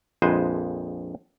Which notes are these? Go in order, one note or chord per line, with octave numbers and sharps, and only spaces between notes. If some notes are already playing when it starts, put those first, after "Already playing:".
A#1 F2 G#3 B4 C5 G#5